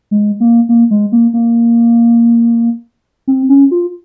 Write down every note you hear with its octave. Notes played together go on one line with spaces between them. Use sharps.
G#3
A#3
A#3
G#3
A#3
A#3
C4
C#4
F4